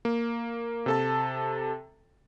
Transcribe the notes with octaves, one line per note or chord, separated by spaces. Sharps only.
A#3
C3 A4 A5